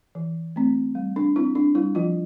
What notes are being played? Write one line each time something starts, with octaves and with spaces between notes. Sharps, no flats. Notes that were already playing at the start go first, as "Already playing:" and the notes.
E3
A3 C4
G3
D4
C4 E4
D4
G3 E4
F3 F4